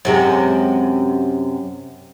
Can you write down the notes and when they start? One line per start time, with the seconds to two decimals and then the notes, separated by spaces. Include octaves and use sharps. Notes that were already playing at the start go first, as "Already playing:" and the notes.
0.05 F#2 C3 G#3